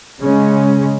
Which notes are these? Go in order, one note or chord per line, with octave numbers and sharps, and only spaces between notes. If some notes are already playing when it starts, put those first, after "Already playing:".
C#3 G#3 C#4